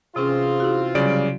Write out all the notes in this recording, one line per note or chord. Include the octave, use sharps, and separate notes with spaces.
C3 E3 C4 C#4 F4 G#4
E4 F#4
C#3 F#3 G3 D5 D7